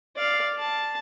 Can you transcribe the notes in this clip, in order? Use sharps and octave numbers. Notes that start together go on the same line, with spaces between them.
D5 F5
A5